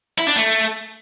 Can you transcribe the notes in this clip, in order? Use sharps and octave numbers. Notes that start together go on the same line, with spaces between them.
E4
D4
A3